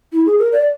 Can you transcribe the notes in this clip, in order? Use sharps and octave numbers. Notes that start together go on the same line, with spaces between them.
E4
G#4
A#4
D5